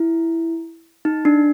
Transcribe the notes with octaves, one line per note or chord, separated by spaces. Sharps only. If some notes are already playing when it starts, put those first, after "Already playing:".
Already playing: E4
D#4
D4